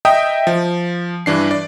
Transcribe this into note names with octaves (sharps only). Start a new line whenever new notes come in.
D#5 E5 G5 A#5 D#6
F3
G2 E3 D4 C7
D5